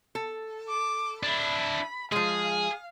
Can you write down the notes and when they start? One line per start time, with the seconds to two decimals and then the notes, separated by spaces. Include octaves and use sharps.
0.15 A4
0.69 D6
1.23 D4 E4 B5
2.12 F3 G#3 G#4 F5